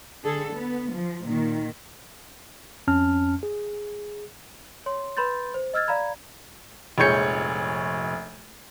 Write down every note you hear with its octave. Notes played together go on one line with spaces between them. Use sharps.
D3 G#4 A4
B3
F3
A#2 D#3
F2 C#4 A5 F6
G#4
C#5 C6
B4 B5 C6 G6 A6
C5
D#5 E6 F6 G#6 A6
D5 F5 A#5 B5 G#6
F1 A#1 G#3 C#5 G6 C#7